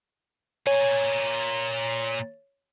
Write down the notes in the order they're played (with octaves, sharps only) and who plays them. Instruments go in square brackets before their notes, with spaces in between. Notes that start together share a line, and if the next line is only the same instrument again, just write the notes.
[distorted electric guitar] A#2 G#5 [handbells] C#5